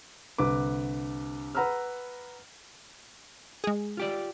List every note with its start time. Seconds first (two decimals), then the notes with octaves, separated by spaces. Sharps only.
0.38 C2 D3 B4 D6
1.55 B4 F#5 A#5 B5 E6 F6
3.64 G#3 G#4
3.97 F4 G4 D5